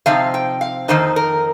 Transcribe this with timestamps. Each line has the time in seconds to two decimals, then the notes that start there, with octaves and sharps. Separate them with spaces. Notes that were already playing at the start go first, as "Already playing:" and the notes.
0.06 C3 F3 C4 D#4 F5
0.34 G5
0.61 F5
0.88 F2 D#3 A#3 D#4 C5
1.16 A#4